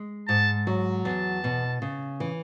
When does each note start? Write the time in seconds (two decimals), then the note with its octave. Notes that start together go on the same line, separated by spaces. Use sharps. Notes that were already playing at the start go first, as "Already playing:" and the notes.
Already playing: G#3
0.28 G#2 A5
0.67 F#3
1.05 E2 A5
1.44 B2
1.82 C#3
2.20 E3